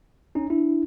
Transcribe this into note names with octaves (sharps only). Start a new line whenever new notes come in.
C#4 D#4
D4 E4